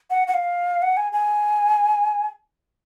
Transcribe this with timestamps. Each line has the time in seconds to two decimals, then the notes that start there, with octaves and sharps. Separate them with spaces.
0.10 F#5
0.28 F#5
0.34 F5
0.82 F#5
0.97 G#5
1.13 G#5